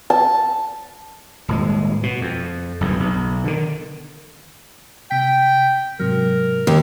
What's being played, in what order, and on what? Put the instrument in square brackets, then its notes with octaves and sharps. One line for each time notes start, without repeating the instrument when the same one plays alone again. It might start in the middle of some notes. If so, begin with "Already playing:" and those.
[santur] A5
[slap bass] D#1 A2 G#3
B2
F2
F#1 B1 E2 G2
B1
D3 D#3
[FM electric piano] C3 B6 [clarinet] G5
[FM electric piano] G#2 C3 F#3 [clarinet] A#4
[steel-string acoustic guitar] D#2